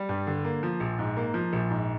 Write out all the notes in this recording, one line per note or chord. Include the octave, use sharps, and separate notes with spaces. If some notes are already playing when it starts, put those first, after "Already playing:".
Already playing: G3
G2
D3
A#3
F3
A#1
G#2
A#3
F3
A#1
G#2